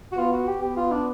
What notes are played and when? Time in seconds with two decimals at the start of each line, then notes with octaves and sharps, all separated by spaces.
0.12 F#4
0.17 B3 F4
0.32 F#4
0.47 G4
0.61 B3 G4
0.77 F4
0.91 D4